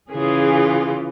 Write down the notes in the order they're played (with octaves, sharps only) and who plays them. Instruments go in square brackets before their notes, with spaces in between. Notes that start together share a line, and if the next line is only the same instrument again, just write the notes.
[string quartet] C#3 E3 F4 [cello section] G#4